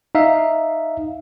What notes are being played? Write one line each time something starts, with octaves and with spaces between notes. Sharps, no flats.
D#4 E5 F5